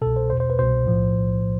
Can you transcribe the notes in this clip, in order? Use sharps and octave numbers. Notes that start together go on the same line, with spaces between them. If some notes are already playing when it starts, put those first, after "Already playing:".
C2 B2 A4
C5
E2 B2 C5
C5
B4
C2 B2 C5
B1 A2 F3